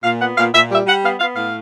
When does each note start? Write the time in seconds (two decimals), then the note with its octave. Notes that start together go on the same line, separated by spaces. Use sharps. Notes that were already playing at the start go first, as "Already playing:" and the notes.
0.04 A#2 F5
0.20 B3 F#5
0.38 A#2 F5
0.54 A#2 E5
0.71 G3 E5
0.87 G3 F#5
1.03 B3 F5
1.20 B3 F5
1.36 A2 F5